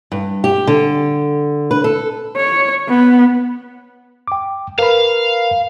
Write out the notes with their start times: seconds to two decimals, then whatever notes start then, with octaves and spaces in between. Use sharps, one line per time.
0.12 G2
0.44 G4
0.67 D3
1.71 B4
1.84 A4
2.37 C#5
2.88 B3
4.28 G5 D6
4.79 A#4 B4 F5 B5